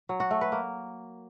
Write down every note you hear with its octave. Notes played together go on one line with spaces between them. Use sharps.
F#3
F#4
A3
B4
A#3